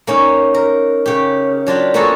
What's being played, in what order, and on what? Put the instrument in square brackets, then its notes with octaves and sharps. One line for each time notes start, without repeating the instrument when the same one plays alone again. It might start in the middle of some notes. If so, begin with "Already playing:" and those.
[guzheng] A#3 C#4 D#4
A#4
C#3 G4
F#3 D4 F4 G4
A#3 B3 F4 F#4 G#4 A4